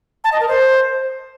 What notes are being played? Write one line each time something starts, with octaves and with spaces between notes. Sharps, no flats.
A5
D#5
A#4
C5